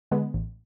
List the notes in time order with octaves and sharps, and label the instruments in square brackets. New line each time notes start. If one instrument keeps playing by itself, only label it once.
[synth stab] D3 G#3 B3
A1